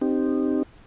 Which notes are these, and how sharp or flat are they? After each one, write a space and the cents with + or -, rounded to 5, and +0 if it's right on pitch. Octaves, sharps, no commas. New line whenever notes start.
C4 +0 D#4 -25 G4 +0